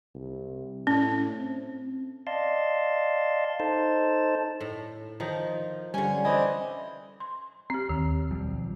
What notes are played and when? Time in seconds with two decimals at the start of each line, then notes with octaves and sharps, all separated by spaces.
0.15 C2
0.87 A2 C#4
1.36 C4
2.27 D5 D#5 F5 A5 C6
3.60 D#4 A4 C5 A5
4.60 A2
5.20 D#3 F3 D#4
5.94 D3 G3 C#4 G#5
6.25 E3 C4 E4 C5 D5 D#5 G#5
7.20 C6
7.70 C4 G4
7.89 D#2 D#3
8.30 B1 F3 G3